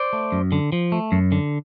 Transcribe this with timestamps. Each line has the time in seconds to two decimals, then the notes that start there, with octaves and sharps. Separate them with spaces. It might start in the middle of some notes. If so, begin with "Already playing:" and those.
Already playing: C5 D5
0.13 A3
0.32 F#2
0.52 D3
0.72 F3
0.92 A3
1.12 F#2
1.32 D3